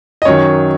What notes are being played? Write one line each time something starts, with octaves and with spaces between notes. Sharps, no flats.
D#5
F#2 D#3 F#3 C#5